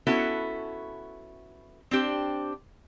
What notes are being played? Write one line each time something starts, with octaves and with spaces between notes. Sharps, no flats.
B3 C#4 E4 F#4 A4
C4 D4 G4 C5